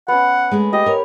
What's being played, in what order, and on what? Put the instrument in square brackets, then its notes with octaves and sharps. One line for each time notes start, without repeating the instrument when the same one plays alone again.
[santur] B3 C#4 [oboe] F#5
[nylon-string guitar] G#3 A3 G#4
[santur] G4 [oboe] D#5
[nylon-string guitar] A#4 C#5